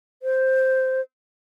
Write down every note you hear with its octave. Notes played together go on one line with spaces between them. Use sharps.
C5